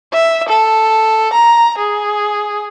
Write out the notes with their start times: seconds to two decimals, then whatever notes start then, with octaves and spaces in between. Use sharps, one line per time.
0.13 E5
0.49 A4
1.33 A#5
1.78 G#4